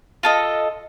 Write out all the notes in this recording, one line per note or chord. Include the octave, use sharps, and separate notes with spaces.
F4 A4 D#5